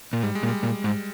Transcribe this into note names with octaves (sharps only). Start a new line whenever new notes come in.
A#2
G#2 G3
G#3
A#2
G3
A#2
G#2